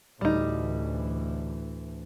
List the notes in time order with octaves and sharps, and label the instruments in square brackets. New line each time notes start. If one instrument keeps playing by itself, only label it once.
[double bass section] D2 A2 E3 [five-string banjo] G3 D#4